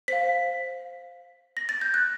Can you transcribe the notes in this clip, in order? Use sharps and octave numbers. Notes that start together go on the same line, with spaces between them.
C5 F5 B6
A#6
A6
G6
F#6